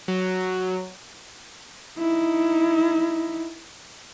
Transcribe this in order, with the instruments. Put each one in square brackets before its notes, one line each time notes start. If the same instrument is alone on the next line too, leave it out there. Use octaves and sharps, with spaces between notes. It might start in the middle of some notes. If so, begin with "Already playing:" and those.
[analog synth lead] F#3
[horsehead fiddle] D#4 E4